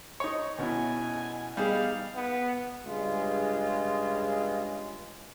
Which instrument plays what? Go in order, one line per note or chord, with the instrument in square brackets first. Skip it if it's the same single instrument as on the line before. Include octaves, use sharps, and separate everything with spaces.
[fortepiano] D#4 C#5
[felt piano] B2 C#4 E4 [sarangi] G#5
[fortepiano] G3 [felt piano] B3 D#4 G#4 [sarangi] F5
[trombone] B3
[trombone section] G2 C#3 G#3 F4